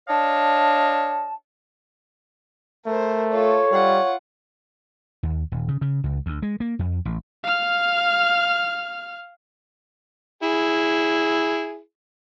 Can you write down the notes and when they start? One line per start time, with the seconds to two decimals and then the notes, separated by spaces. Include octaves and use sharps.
0.08 D4 C#5 D#5 F5 A5
2.86 A3 A#4 C5
3.32 F4 A4 C#5
3.72 G3 F4 F#5
5.23 D#2
5.52 D#1
5.68 C#3
5.81 C#3
6.04 C#2
6.26 D2
6.42 G#3
6.60 A#3
6.79 F2
7.05 A1
7.44 F5 F6
10.43 E4 G#4